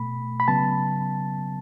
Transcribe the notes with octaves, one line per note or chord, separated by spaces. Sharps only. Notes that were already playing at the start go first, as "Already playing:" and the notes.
Already playing: B2 A3 B5
B5
C#3 F#3 B3 A5